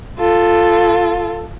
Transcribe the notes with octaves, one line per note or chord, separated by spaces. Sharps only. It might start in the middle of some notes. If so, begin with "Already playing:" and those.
F4 A4